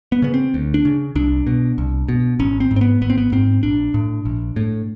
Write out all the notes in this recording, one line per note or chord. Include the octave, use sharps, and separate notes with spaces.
B3
C#3 B3
C4
D2
D4
C#3
C2 D4
B2
C2
B2
G#1 C#4
C4
G#2
C4
B3
G#1 B3
C4
B3
G#2 C4
A#1 D4
A2
A#1
A2